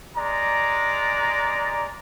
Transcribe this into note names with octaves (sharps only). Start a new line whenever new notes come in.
G#3 D5 A#5